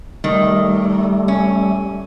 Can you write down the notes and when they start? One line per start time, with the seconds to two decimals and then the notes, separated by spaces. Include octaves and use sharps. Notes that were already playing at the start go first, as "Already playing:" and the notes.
0.24 D#3 G3 A3
1.28 C#4